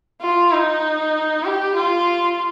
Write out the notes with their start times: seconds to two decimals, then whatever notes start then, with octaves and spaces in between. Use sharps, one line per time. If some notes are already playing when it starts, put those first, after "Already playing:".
0.22 F4
0.53 D#4
1.45 G4
1.76 F4